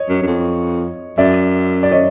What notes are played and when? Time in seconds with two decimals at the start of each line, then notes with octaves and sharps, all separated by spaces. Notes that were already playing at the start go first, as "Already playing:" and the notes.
Already playing: C#5 D#5
0.09 F#2
0.22 F#2
0.27 F2
1.18 F#2 D5 E5
1.83 D5
1.91 C#5 D#5